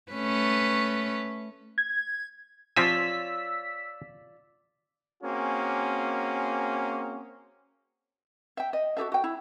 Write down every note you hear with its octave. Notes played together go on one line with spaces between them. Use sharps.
A3 C#4 B4
G#6
F3 C4 F4 C#5 D5 G#5 E6 B6
A#3 C4 C#4 F#4 G#4
E5 G5
D#5
F#4 G4 A4 E5
F#4 G5
E4